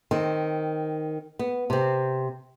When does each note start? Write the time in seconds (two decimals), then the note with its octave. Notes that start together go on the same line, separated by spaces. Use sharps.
0.11 D#3 C4
1.39 B3
1.70 C3 C4